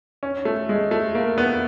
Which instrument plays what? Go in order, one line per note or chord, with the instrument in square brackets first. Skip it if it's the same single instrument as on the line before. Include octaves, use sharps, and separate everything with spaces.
[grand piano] C#4
A3
G#3
A3
A#3
B3